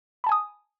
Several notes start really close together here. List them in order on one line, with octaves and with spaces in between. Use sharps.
B5 A5 G#5 D#6